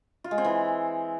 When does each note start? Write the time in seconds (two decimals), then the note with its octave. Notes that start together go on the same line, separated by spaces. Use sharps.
0.24 F4
0.31 G#3
0.38 C4
0.45 E3